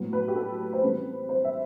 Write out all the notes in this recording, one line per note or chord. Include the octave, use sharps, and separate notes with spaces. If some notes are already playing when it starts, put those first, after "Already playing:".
Already playing: A2 F#3 B3
B4
G4
A4
C5
E3 G3 C4 B4
C5
E5